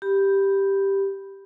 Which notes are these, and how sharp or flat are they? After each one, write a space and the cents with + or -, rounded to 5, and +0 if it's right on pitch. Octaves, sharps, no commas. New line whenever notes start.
G4 +0 B5 +0